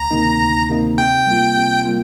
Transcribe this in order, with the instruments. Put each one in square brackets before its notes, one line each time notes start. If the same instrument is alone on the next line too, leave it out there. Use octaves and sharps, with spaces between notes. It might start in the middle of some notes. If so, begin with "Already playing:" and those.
Already playing: [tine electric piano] D2 [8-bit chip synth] A#5
[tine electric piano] C3 D#3 A#3 D#4
D2
C3 D#3 A#3 D#4
[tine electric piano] C3 [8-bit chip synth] G5
[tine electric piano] G3 A#3 F4
C3
G3 A#3 F4